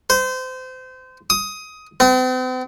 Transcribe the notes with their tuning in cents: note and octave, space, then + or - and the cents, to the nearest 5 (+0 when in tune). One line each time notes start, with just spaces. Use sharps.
C5 -30
D#6 +15
C4 -45